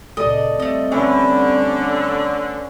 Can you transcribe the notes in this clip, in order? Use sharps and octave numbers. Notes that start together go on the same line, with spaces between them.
C#2 A#2 A4 D5 D#5
G3 A3 C4 D#5
D3 A3 C#4 B4